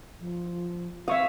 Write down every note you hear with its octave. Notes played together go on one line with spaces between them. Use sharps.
F3
C4 E5 F5 C#6 D#6